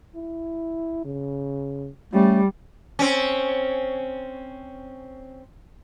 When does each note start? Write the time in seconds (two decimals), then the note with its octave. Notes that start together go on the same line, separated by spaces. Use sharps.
0.15 E4
1.05 C#3
2.14 G3 A3 C#4
2.99 C4 C#4